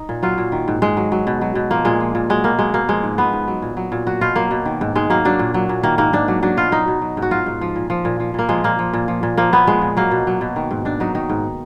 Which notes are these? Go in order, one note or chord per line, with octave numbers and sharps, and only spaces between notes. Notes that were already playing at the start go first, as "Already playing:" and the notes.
Already playing: D#4
A#2
F#3 F4
A#2
D#3
G#2
G#2 G#3
F#3
F#3
B2
F#3
B2
F3 A#3
A#2 G#3
F3
A#2
F#3 G#3
B2 A#3
F#3 G#3
B2 A#3
F3 G#3
G#2
F3 B3
G#2
F#3
A#2
F#3
A#2
F#3 F#4
B2 F4
F#3 A#3
B2
D#3
G#2
G#2 G#3
F#3 A#3
F#3 D4
A#2
F#3
A#2
D#3 A#3
G#2 A#3
G#2 D4
F#3
F#3 D4
B2 F4
F#3 D#4
B2
F#3
G#2
F#4
F#3 F4
G#2
F3
A#2
F3
A#2
F3
A#2 A#3
F3 G#3
A#2 A#3
F3
A#2
F3
A#2
F3 A#3
A#2 B3
F3 G#3
A#2
F#3 A#3
B2
F#3
B2
D#3
G#2
G#2 D4
F#3 D#4
D#3 D#4
G#2